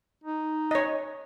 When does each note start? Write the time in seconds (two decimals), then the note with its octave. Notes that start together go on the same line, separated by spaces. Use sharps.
0.24 D#4
0.71 C#5 D#5